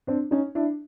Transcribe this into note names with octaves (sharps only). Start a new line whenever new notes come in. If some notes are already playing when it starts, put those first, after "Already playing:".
C4 D4
C#4 D#4
D4 E4